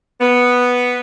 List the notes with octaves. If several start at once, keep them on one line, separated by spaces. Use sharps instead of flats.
B3